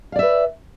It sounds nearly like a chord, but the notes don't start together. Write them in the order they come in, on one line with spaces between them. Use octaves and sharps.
F5 D5 E5 B4